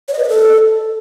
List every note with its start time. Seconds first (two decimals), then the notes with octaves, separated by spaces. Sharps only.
0.08 C#5
0.13 D#5
0.19 B4
0.24 D#5
0.29 A4